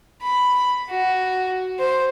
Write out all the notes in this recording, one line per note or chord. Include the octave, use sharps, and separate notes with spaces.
B5
F#4
C5